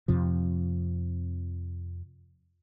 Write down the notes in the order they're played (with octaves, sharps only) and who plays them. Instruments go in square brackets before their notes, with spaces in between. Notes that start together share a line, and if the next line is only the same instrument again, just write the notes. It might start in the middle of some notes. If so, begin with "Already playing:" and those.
[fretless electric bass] F2 C3 F3